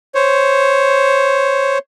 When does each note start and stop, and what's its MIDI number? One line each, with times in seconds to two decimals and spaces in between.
0.15 1.78 72
0.15 1.78 73